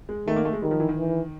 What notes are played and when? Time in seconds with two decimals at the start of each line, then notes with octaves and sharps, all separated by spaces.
0.09 G#3
0.27 D#3 A3
0.36 A#3
0.45 A3
0.53 G#3
0.62 D#3 G3
0.71 F3
0.80 E3
0.89 D#3
0.97 E3